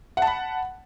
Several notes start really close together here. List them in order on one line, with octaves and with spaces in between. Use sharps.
F#5 A5 B5